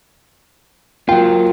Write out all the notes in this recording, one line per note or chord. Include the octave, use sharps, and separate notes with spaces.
F#3 A#3 F4 G5